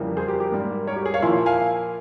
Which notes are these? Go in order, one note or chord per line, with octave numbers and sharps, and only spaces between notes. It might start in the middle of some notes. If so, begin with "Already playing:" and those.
Already playing: F2 C#3 E3 G3 A#3
G#4 C5
G4 A#4
G4 A#4
G#2 G3 A#3
A#4 C#5
G4
G#4
C#5 F5
A#2 F3 A#3 E4 G#5 C6
F5 G#5